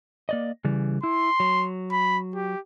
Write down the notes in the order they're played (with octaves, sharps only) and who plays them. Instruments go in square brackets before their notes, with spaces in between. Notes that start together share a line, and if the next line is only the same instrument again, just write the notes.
[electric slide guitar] A#3 D5 D#5
C#3 E3 G3
[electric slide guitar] E4 [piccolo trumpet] C6
[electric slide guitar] F#3
[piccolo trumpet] B5
G4